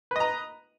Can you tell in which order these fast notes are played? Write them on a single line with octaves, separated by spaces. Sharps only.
B4 D#5 A#5